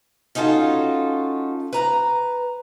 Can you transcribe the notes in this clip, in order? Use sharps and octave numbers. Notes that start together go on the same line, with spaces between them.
C#4 D#4 F4 F#4 A4
B4 A#5